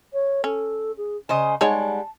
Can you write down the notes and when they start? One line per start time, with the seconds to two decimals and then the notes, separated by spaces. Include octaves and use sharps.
0.13 C#5
0.44 C#4 A4
0.97 G#4
1.29 C#3 C5 D#5 G#5
1.61 G3 G#3 D#4 G#4 C#5 F#5 A5